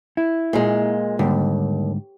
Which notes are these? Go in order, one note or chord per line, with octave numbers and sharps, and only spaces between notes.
E4
A#2 G#3
D#2 G#2 D3 G3